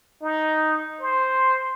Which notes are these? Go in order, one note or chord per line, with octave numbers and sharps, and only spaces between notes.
D#4
C5